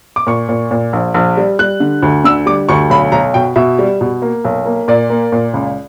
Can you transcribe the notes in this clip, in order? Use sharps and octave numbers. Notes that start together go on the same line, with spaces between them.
D6
A#2 C#6
A#2
A#2
A#1
A#1
G3
G3 F#6
D3
D2
D3 E6
G3 D6
D2 C#6
B1 B5
B1 A#5
B2 G5
B2 E5
G3
B2
A#3
B1
A#3
A#2 D5
A#3
A#2
C#2